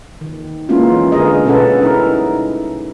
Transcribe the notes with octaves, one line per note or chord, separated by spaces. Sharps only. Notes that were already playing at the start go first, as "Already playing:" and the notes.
D#3
G#3 A#3 B3 C#4 E4 F4
E3
D3 G#4 A#4 D#5
B2 C#4 G#4 A4 B4 F#5
G3 D#4 E4 A#4